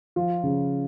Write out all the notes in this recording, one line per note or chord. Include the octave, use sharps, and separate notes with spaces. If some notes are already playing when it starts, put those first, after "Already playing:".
F3 F4
C#3